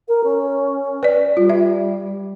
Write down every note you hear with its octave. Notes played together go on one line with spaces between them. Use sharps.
A#4
C#4
B4 D5
G3 F4
E5